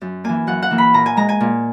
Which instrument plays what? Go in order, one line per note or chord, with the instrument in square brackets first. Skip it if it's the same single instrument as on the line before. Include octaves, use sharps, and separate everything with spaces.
[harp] F#2
E3 A#3 G#5
F#2 F#5
F#5
E3 A#3
B5
A#2 A#5
G#5
G#3 A#5
G#5
A#2